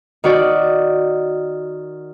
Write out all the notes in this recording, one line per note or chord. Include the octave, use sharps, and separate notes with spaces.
D#3 F#4 D5